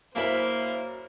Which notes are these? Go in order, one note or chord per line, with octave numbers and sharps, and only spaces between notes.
F#2 A#3 E4 A#4 C5 E5 B5